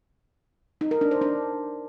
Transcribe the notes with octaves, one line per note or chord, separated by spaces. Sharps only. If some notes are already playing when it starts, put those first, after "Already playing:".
D#4
A#4
D4
C5
D4